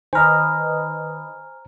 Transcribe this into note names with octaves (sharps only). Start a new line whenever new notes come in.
D#3 B4 C5 D#5 G#5 A#5 F6